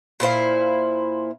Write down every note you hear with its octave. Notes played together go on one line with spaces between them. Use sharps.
A#2 E4 C5 F5